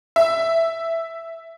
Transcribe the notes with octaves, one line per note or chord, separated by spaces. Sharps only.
E5